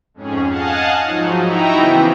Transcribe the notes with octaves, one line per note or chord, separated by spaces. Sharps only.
F2 G#2 C#4 G#4
D#5 F5 F#5 G#5 A5
G#2 F3 F#3 D#4
D#4 E4 F#4 E5 G5 A#5
C#3 E3 B3 C4